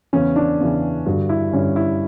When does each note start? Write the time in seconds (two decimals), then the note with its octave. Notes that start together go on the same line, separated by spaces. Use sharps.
0.13 E2 C#3 E3 C#4
0.36 D4
0.60 E2 C#3 E3
1.06 G2 D3 F#4
1.29 E4
1.53 G2 D3 C#4
1.76 E4